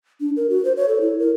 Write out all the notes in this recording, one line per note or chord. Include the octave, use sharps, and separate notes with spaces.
D4
A#4
F#4
C5
C#5
A4
E4
A#4